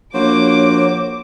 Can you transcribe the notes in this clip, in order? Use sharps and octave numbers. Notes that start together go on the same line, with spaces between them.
A#1 A#3 F#4 C5 C#5 D6